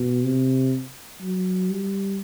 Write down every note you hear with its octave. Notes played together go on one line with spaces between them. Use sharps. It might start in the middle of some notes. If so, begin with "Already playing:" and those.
Already playing: B2
C3
F#3
G3